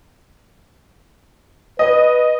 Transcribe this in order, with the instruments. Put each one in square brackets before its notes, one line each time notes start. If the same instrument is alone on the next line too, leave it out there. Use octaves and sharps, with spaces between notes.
[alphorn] B4 [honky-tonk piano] D#5